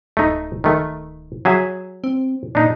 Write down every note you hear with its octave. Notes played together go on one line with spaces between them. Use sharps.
D1 A3 D#4
D#3 A3
F#3 G#4 E5
C4
A#2 D4 D#4